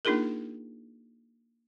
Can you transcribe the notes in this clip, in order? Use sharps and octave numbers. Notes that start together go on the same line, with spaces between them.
A#3 D4 D#4 F4 G#4 A#4